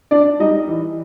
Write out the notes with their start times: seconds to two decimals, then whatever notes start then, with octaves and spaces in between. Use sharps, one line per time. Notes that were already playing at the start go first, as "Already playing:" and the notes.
0.11 D4 D5
0.40 G3 D#4 D#5
0.67 E3